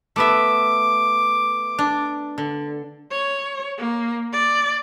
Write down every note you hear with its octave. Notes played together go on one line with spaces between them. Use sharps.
A3 B3 E5 D6
D4
D3
C#5
A#3
D5